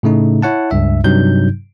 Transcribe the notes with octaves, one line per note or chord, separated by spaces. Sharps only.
A2 C#3 A3 D#4
E4 C#5 F#5 A5
C#2 G2 E5
G2 C3 F#3 D#4 G6